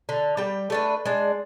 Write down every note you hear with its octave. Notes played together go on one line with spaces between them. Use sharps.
D3
G3 G5
A3 D4 B4
G#3 D4